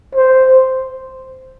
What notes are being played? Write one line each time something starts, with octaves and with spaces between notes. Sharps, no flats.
C5